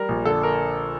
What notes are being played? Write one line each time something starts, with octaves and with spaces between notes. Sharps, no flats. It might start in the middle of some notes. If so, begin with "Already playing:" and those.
Already playing: G3 A#4
A#1
D3 A4
A#4